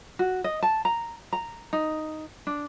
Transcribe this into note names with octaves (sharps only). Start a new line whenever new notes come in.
F#4
D#5
A5
A#5
A#5
D#4
D4